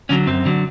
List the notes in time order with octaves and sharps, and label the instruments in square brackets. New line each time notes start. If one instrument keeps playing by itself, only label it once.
[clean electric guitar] D3 F#3 C#4
F#2 C4
D3 F#3